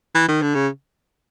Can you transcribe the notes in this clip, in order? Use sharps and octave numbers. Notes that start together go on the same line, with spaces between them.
E3
D#3
D3
C#3